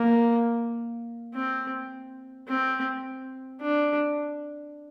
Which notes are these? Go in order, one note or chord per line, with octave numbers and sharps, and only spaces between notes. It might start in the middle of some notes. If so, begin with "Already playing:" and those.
Already playing: A#3
C4
C4
D4